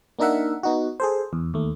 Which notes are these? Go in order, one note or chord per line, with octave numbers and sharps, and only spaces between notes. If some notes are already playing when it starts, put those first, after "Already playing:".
A#3 D4 D#4 A#4 E5 F#5
B3 D#4 F#4
G#4 A4 C5
E2
D#2 A3